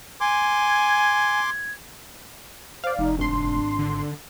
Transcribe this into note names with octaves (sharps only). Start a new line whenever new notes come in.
G#5 C6 D6 G#6
C5 D5 F5
F1 D#4
G#1 D4 C6
D3